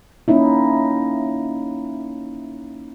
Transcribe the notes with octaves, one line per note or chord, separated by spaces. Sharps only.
A#3 C#4 D#4 E4